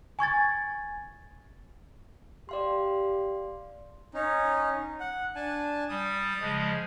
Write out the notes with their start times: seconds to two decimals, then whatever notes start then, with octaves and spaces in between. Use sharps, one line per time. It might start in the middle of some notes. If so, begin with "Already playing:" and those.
0.19 G#5 C#6 G#6 A6
2.49 G4 D5 F5 C6
4.14 C#4 D#4
5.00 F#5
5.36 D4 G#5 A5
5.89 G3 D#6
6.41 C#3 F3 G#3